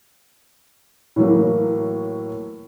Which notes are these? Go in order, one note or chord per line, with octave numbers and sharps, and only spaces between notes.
A2 E3 F#3 A#3